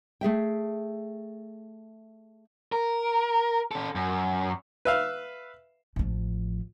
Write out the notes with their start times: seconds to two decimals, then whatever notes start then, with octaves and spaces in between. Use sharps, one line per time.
0.21 A3 G#4 E5 G5
2.72 A#4
3.71 C#4 A4
3.95 F#2
4.85 B4 E5 F5
5.96 A1 F3